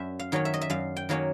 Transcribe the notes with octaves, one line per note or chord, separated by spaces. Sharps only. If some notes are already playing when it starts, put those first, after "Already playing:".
Already playing: F#2 E5
F5
D#3 F#3 A#3 C#4
E5
D#5
E5
F#2 F5
G5
D#3 F#3 A#3 C#4